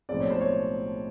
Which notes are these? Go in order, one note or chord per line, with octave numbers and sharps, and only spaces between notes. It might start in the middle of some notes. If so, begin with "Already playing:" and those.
B1 A2 F3 G#3 C4 D5
C#5
C5
C#5